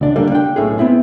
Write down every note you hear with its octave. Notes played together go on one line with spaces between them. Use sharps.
C#2 D4
D3 G3 A#3 D4
D4 G5
B1 A2 C#4 G#4
B3 C4 E4